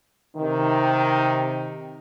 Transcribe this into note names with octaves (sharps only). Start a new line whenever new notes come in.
C3 D#3